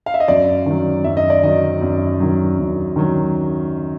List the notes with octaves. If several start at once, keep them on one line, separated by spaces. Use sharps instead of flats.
F5
E5
D#5
F#2 D5
D#3 F#3
F#2 E5
D#5
D5
D#3 F#3 D#5
F#2
D#3 F#3
F#2
D#3 F#3